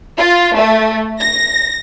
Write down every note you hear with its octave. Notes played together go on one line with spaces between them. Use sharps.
F4
A3
A#6